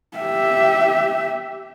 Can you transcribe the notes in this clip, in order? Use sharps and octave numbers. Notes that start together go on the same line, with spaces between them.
G4 E5